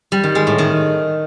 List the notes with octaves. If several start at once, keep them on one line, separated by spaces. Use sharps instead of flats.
G3
D#3
G#3
A2
D#3